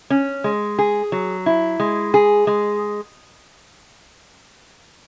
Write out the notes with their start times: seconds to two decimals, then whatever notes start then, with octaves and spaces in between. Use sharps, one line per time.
0.10 C#4
0.44 G#3
0.79 G#4
1.12 F#3
1.46 E4
1.80 G#3
2.14 G#4
2.47 G#3